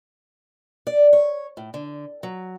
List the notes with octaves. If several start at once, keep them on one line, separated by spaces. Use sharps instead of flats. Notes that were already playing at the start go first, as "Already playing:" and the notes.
D5
C#5
A2
D3
F#3